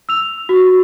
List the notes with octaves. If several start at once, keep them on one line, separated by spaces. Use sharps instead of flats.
E6 F7
F#4